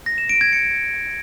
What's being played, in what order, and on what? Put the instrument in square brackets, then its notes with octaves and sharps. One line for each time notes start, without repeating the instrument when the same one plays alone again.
[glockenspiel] A#6
E7
D7
G#6
C#7